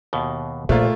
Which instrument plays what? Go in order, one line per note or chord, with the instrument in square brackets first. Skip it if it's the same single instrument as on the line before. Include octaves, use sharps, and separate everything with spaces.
[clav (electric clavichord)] D#2 B2
[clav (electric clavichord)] A#1 [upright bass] A#2 [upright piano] A3 A#3 F4